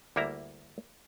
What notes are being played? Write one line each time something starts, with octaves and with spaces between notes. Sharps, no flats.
D2 G3 A#3 E4 E5 A#5